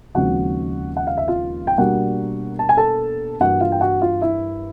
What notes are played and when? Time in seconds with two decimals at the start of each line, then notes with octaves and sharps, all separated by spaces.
0.15 D#2 C#3 F3 G#3 C4 F#4 F#5
0.97 F#5
1.07 F5
1.17 E5
1.28 F4 F5
1.67 G5
1.78 B2 G3 A#3 D4 F#4 F#5
2.59 A5
2.69 G#5
2.77 A4 A5
3.40 G2 E3 G3 A#3 F#4 F#5
3.61 F4 F5
3.72 G5
3.81 F#4 F#5
4.01 F4 F5
4.21 E4 E5